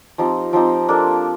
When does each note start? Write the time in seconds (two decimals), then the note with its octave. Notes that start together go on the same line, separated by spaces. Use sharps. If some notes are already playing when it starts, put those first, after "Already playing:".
0.18 F3 C4 D#4 G4
0.53 F3 C4 D#4 G4
0.88 A#3 D4 A4